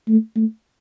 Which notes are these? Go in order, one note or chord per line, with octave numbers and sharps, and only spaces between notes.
A3
A3